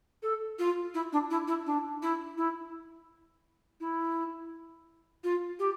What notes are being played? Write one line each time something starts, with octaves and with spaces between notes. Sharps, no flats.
A4
F4
E4
D4
E4
E4
D4
E4
E4
E4
F4
G4